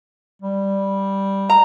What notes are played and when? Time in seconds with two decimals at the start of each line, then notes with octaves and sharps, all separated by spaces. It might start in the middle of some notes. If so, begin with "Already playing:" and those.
0.42 G3
1.49 A#5